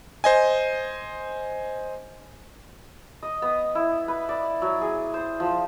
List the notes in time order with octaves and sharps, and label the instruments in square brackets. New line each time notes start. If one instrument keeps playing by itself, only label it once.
[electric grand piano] C5 D#5 G#5
[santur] D#5
B3
E4
B4
D5
F#3
G#4
C5
F3